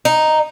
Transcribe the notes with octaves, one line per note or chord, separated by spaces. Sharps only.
D#4